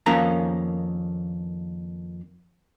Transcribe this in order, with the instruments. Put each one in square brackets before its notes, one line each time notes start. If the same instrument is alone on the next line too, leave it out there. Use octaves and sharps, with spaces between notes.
[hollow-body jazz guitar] F2 D#3 A#3 C#4 A#5